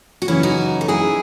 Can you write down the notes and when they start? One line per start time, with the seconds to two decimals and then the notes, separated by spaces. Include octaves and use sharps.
0.22 F#4
0.28 F#2 C#3 E3 C#4 E4
0.43 D#4 F#4
0.81 A4
0.88 F#2 E3 E4 G#4